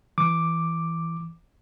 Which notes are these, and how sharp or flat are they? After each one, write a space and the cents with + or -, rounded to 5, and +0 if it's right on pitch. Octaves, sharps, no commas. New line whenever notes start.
E3 +0 D6 +0